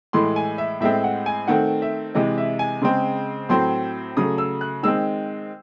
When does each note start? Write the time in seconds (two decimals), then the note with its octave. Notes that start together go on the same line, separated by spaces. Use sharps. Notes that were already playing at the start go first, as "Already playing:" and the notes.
0.13 A2 E3 G#3 C6
0.36 G#5
0.58 E5
0.81 A2 G#3 C4 E5
1.04 F#5
1.26 G#5
1.48 D#3 A3 C4 F#5
1.82 E5
2.15 C3 E3 G#3 D#5
2.38 E5
2.59 G#5
2.82 C#3 G#3 C4 C6
3.49 A2 F#3 C4 C6
4.17 C#3 F#3 A3 D#6
4.38 E6
4.61 F#6
4.83 D#3 G#3 C4 E6